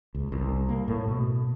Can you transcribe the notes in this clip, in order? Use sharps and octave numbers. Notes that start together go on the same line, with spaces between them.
C#2
C2
A#3
A2
B2